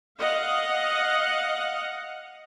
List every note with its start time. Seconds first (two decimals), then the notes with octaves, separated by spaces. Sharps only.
0.20 D#5 F5 F#5